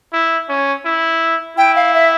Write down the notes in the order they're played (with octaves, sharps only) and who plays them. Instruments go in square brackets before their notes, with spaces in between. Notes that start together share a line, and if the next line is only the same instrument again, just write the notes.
[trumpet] E4
C#4
E4
[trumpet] E4 [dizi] G5
[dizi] F5
E5